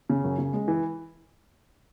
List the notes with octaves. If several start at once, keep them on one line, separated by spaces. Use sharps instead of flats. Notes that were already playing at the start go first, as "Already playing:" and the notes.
C#3
F#2
C#3
G#3
E3